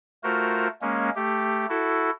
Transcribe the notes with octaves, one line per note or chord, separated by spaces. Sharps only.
A3 F4 F#4 A#4 C5
G#3 A#3 C#4
A3 G4
E4 F#4 A4